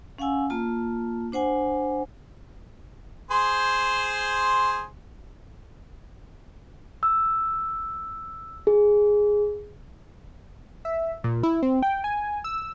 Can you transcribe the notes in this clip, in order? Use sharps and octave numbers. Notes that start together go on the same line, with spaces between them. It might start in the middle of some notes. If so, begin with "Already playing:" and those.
C#4 F5 F#5 G#5 E6
A#3 F4 A5
D4 C5 F#5 G#5
G#4 C5 C6
E6
G#4
E5
A#2
E4
C4
G5
G#5
E6